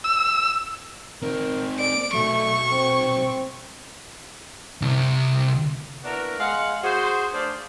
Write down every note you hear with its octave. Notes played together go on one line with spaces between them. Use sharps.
E6
C4 D#4 A#4
D5 D7
B1 F#3 A3 C#6
C4
C2 C3
A#3 B3 D4 E4 F#4 A#4
G#3 F5 F#5
F#4 G#4 C5
A3 D4 G#4 C5 D5 F5